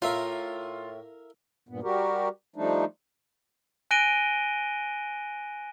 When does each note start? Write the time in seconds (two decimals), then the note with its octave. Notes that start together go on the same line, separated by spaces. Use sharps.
0.02 A2 F4 A#4 E5 F5
1.69 G2 A#2 B3
1.83 G3 F#4 G4 A#4
2.56 F3 G3 A3 D4 D#4
3.91 G#5 F#6 A#6 D7 D#7 G7